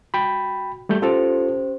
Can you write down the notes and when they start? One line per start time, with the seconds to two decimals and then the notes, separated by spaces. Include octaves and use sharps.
0.14 F#4 G5 B5
0.89 G3 A3 G6
1.02 C#4 F4 G4 A4 C5